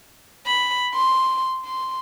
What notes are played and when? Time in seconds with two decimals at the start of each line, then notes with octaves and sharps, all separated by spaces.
0.46 B5
0.94 C6
1.65 C6